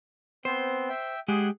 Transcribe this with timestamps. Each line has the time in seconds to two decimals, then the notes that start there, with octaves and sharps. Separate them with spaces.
0.45 B3 C4 C5
0.89 E5 G5
1.28 G#3 G4 G#4 F#5 F#6